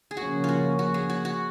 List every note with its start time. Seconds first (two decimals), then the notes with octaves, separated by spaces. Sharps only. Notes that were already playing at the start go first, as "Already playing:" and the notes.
0.11 G#4
0.17 C#3 F3 A#3 C#4 F#4
0.44 F4 F#4
0.79 F#4
0.94 G#4
1.10 F#4
1.25 F#4